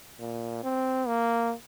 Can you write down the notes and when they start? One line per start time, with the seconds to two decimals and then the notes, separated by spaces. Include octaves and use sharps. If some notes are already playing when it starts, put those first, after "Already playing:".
0.20 A#2
0.64 C4
1.07 A#3